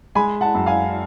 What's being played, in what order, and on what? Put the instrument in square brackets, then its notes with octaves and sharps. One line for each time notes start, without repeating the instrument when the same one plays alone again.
[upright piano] G#3 G#5 B5
F#5 A5
F#2
F5 G#5